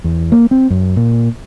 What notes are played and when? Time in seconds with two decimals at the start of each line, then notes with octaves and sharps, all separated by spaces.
0.04 E2
0.32 A#3
0.51 C4
0.70 F#2
0.96 A#2